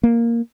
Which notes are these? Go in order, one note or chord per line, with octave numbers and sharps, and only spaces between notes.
A#3